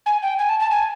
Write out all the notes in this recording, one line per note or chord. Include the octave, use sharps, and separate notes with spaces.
G#5
G5
G#5
A5
A5
G#5